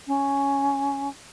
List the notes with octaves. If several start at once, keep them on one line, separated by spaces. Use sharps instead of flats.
C#4